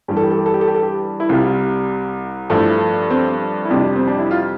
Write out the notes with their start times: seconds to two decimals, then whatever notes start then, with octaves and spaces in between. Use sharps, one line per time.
0.08 G2 E3 G3 G4
0.17 A4
0.23 G4
0.31 A4
0.39 G4
0.46 A4
0.54 G4
0.61 A4
0.68 G4
0.75 A4
0.83 G4
1.20 E4
1.29 C2 C3 G3 F4
2.50 G2 F3 A3 E4
3.10 C4
3.65 E4
3.70 F2 C3 G3 D4
3.96 C4
4.07 D4
4.18 E4
4.31 F4